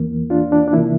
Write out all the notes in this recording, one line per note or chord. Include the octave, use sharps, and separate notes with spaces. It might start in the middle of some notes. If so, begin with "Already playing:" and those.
Already playing: E2 E3 A#3
D4 F4
D4
D4
C3 E3 A#3 E4